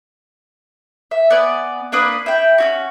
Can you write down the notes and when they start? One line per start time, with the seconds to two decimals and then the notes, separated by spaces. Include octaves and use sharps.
1.11 E5
1.30 B3 D5 G#5
1.92 A#3 D4 B4 D#6
2.26 E4 G5
2.58 C#4 E4 F#4